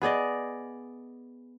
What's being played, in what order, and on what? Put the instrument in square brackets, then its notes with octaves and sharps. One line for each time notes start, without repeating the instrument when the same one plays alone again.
[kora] B3 G#4 D5 D#5